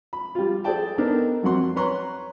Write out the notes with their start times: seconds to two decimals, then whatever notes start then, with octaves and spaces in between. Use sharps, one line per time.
0.13 B5
0.35 G3 F4
0.64 G#4 A4 C5 D5 G5 A5
0.98 B3 D4 D#4 A4 A#4 C5
1.43 F2 F#3 C4 F#5 C6
1.76 B4 C#5 A#5 C6 C#6 F#6